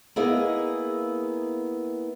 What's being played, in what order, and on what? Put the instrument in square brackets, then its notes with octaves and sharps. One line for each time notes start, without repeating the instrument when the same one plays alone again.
[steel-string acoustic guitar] A#3 B3 E4 G#4 D#5